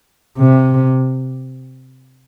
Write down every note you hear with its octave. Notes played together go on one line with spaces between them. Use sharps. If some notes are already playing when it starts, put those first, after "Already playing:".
C3